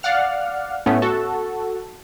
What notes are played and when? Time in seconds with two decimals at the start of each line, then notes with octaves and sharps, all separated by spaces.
0.03 D5 F5 F#5 F6
0.86 A2 A3 B3 C#4
1.02 F#4 A4